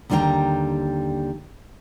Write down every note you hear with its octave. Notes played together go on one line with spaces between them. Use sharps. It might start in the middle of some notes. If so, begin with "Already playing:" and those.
D#2 D3 G3 C#5 G5 A#5